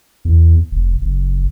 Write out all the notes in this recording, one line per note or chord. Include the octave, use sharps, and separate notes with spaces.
E2
F1
F#1